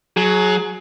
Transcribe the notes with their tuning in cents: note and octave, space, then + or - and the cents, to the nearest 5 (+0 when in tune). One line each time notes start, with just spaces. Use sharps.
F#3 +0 G#4 +25